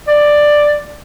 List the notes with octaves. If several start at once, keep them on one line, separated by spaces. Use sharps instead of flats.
D5